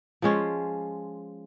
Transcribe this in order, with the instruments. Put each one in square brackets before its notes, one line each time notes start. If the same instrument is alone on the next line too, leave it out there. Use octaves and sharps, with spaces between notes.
[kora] F3 G#3 C#4 F4